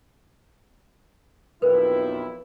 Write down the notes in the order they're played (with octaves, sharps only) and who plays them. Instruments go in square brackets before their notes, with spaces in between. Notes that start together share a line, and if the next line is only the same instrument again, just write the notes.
[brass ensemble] B1 F2 E4 [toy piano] A#4 B4